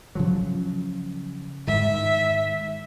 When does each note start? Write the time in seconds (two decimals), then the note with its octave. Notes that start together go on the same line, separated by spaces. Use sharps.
0.15 C#3 F3 F#3
1.67 G#2 D#3 E5